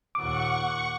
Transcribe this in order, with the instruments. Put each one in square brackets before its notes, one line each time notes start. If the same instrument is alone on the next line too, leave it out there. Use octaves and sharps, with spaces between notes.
[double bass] D#2 A#2 [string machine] F#5 C#6 [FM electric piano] D6